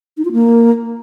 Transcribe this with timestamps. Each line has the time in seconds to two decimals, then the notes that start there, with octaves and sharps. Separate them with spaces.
0.18 D#4
0.25 F4
0.32 A#3